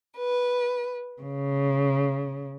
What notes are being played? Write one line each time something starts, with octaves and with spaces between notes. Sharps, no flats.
B4
C#3